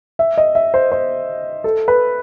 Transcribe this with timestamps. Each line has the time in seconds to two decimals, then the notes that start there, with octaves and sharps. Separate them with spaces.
0.19 E5
0.38 D#5
0.55 E5
0.74 C5
0.92 C5
1.64 A4
1.88 B4